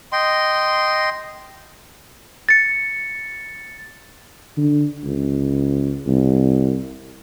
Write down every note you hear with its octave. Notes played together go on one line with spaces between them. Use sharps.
D#5 G5 C6
A6 C#7
D3
C#2
C2